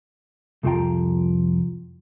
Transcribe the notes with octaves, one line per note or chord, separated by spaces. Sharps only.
C2 F2 F3 F4 G5 A#5